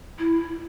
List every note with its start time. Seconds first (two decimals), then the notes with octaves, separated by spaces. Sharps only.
0.18 E4